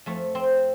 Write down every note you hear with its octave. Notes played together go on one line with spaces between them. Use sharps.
F2 F3 A3
C4